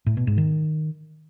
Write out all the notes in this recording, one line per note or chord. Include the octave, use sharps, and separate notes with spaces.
A2
B2
G#2
D#3